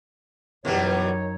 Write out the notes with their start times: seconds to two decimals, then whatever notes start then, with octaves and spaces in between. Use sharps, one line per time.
0.65 F#2 B2 D#3 E3 G3 D#4 C#5